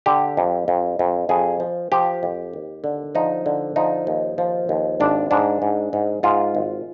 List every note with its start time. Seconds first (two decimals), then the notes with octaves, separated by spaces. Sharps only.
0.06 D3 G4
0.37 F2
0.68 F2
0.99 F2
1.29 F2 G#4
1.60 F3
1.92 F3 G4
2.23 F2
2.53 D#2
2.84 D3
3.15 F3 D#4
3.46 D3
3.76 F3 D#4
4.07 D#2
4.38 F3
4.69 D#2
5.00 G#1 D4
5.31 G#2 D4
5.62 G#2
5.93 G#2
6.23 G#2 F4
6.55 G#1